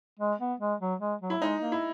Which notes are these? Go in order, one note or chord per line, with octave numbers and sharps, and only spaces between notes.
G#3
B3
G#3
F#3
G#3
F#3
E4
G#3 D#4
A#3
E4